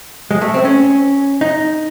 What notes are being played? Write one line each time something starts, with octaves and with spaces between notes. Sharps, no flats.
G#3
A3
C4
C#4
D#4